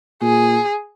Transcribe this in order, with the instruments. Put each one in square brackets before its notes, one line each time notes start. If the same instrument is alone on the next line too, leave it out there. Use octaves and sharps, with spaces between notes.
[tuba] A#2 [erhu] G#4